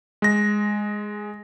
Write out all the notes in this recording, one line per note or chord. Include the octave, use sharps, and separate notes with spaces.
G#3 A#6